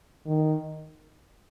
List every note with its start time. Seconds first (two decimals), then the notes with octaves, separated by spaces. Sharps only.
0.26 D#3